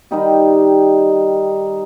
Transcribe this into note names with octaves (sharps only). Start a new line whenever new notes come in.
D#3 G3 D#4 G4